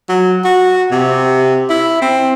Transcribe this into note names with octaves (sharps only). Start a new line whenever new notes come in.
F#3
F#4
C3
E4
C4